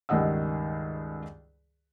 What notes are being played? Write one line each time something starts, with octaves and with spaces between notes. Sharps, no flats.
C#2 G2 D#3 D#5 F#5 E6